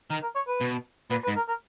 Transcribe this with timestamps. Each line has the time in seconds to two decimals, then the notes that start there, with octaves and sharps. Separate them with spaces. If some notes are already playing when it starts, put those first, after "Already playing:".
0.10 D#3 A#4
0.22 A#4
0.36 C#5
0.48 B4
0.61 B2
1.10 A#2 B4
1.24 B4
1.28 G#2
1.36 A#4
1.48 A#4